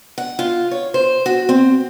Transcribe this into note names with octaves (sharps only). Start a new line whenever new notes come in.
F#5
F4
C#5
C5
F#4
C4